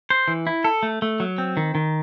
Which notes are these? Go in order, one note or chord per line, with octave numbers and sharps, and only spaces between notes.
C5
E3
E4
A4
A3
A3
F#3
C4
D#3
D#3